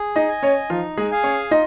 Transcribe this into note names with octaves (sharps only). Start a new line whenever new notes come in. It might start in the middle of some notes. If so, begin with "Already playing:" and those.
Already playing: G#4
D#4 D#5
D#5 G#5
C#4 C#5
F3 D#4 F4
G#3 G#4
G#4 F5 G#5
C#4 C#5
D#4 F4 D#5